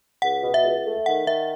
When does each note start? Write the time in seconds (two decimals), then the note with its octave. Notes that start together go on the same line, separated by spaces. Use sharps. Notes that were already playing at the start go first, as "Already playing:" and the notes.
0.22 C#2 F#5
0.43 B2
0.54 E5
0.64 C#2
0.86 A3
1.06 D#3 F#5
1.27 D#3 E5